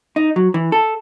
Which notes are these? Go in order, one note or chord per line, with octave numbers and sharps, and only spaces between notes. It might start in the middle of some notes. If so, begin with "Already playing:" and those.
D#4
F#3
E3
A4